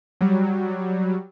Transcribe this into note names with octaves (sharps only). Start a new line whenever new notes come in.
F#3 G3